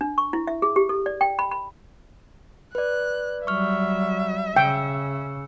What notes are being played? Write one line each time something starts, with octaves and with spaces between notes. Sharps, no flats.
D4
C#6
E4
E5
G#4
G4
A4
D5
G5
B5
B5
B4 D5 F#6
F#3 G3 E5 C#6 F6
C#3 G5 E6 C#7